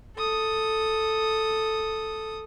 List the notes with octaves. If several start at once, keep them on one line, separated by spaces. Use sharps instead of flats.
A4 D#6